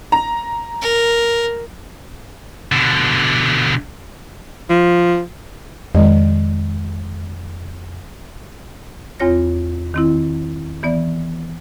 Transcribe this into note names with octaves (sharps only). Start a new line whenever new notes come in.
A#5
A#4
B2 D3
F3
F2 D#3 G#3 D#5
E2 C4 F4 C#5 A#6
D#3 C4 E4
E3 B3 D5